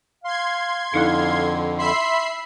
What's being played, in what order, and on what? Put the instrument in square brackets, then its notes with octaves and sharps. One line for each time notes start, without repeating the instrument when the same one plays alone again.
[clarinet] F5 [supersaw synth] C6 G#6
[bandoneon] F2 D3 [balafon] D#4 E4 A4 [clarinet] F5
[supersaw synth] E5 B5 C7 [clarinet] C6